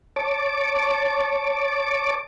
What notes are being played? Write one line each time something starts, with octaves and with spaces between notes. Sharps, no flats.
C#5 A5 D6